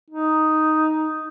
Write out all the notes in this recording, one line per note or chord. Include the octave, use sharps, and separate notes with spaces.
D#4